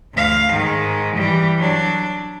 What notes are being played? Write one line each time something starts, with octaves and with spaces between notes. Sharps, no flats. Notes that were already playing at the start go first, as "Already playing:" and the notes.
D2 F5
G#2 D#3
E3 G3
F#3 D4